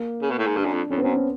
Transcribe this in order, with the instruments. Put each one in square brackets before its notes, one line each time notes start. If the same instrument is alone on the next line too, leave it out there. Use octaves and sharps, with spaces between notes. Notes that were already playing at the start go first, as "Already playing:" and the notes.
Already playing: [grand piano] A#3
[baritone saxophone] C#3
B2
A2
G#2
[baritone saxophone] G2 [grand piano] D4
[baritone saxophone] F#2
F2
[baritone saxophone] F2 [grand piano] C#4
[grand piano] B3
[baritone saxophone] F#2 [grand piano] C4
[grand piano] C#4